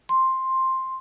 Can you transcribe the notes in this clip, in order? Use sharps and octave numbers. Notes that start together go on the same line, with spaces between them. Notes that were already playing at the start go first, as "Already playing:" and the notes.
C6